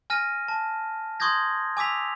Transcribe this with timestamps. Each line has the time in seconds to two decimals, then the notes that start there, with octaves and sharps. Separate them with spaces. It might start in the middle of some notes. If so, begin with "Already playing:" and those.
0.10 G#5 F6 A#6 D#7
0.48 A5
1.20 C6 C#6 D#6 G6 G#6 A#6
1.77 G#5 D6 E6 B6 F7